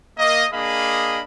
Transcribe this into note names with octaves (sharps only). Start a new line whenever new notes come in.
A#3 D#5
A#3 D4 G#4 D#5 F5 B5